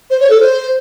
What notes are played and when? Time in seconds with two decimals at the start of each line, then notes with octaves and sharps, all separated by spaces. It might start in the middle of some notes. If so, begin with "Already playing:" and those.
0.10 C5
0.20 C#5
0.30 A4
0.40 C5